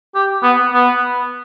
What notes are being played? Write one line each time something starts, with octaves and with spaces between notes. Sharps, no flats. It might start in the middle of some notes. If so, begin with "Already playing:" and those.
G4
B3
B3